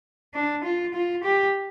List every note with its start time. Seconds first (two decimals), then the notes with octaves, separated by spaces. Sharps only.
0.34 D4
0.64 F4
0.94 F4
1.24 G4